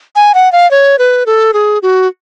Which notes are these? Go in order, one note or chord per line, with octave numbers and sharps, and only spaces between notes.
G#5
F#5
F5
C#5
B4
A4
G#4
F#4